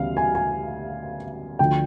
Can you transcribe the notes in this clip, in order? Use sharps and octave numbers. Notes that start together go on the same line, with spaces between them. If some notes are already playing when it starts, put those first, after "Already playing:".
Already playing: D2 C#3 E3 G3 B3 F5
G#5
G#5
D2 D3 F3 G5